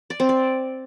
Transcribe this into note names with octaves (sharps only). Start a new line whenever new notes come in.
D5
C4
D5